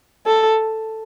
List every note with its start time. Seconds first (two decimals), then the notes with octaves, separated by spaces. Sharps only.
0.26 A4